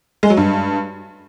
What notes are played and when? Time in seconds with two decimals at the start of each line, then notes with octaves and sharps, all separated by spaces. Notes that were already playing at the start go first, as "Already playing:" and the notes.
0.23 G#3
0.30 F#3
0.37 G2